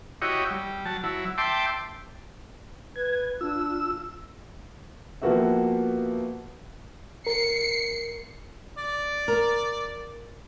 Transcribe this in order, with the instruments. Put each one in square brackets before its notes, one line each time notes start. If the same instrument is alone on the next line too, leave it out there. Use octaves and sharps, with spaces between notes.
[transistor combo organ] E4 F#4 G4 C#5 D#5
G3
F#3 A5
F#3 E4
E5 G5 A5 C6 D6
[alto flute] B4 [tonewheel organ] G#6
[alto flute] D4 [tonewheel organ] F4 E6
[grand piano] F3 A#3 B3 F#4 G4 E5
[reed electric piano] A#4 [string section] C7 C#7
[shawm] D5
[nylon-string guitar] A#4